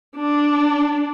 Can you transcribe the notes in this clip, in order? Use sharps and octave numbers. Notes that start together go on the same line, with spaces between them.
D4